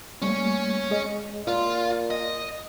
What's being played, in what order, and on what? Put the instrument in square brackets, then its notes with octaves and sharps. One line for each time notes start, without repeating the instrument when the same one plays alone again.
[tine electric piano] G3 A3 A#3 [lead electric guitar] C#4 C#5
[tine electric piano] G#3 G#4 D#5
[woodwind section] A#2 [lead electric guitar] F4 [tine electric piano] C6
[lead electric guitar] D#5